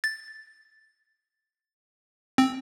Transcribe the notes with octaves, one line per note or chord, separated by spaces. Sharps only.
A6
C4